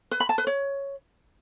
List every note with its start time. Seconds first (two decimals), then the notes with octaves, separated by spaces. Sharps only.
0.11 B4
0.20 B5
0.29 A5
0.38 B4
0.47 C#5